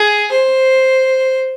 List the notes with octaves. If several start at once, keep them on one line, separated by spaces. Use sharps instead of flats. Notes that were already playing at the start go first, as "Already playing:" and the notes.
Already playing: G#4
C5